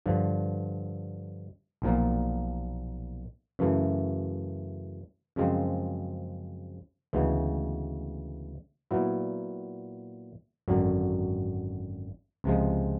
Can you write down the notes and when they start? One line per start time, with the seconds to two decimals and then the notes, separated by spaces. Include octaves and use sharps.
0.06 G2 D3 F3
1.82 B1 A#2 F3 A#3
3.59 F#2 C#3 E3 A3
5.36 F#2 C#3 F3 G#3 C4
7.13 D2 C#3 E3 G#3 B3
8.91 A#2 F#3 B3 E4
10.68 G#1 F#2 D3 F#3
12.44 C#2 C3 F3 G#3